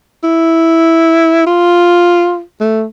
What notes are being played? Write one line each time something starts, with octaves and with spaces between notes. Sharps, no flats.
E4
F4
A3